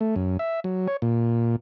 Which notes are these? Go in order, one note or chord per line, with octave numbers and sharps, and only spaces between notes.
A3
F#2
E5
F#3
C#5
A#2